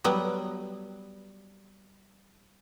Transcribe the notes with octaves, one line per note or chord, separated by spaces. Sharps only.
F#3 G3 B3